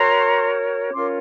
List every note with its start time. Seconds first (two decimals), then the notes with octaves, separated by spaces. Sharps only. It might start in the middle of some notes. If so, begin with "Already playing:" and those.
Already playing: F#4 A#4 C#5 A#5 C6
0.92 C#4 F4 A#4 C#5 C6 D6